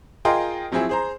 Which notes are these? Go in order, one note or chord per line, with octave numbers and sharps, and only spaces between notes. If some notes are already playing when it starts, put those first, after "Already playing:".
F4 G#4 A#4 D#5 G5 C6
F3 F#3 C4 E4 G#4
G#4 C5 A#5